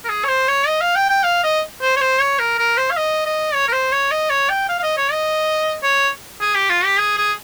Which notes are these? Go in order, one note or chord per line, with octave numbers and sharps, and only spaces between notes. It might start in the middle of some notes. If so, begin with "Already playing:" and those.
A#4
G#4
C#5
C5
C#5
D#5
F5
G5
G5
F5
D#5
C5
C#5
C5
C#5
A#4
A#4
C5
F5
D#5
D#5
C#5
A#4
C5
C#5
D#5
C#5
G5
F5
F5
D#5
C#5
D#5
C#5
G#4
G4
F4
G4
G#4
G#4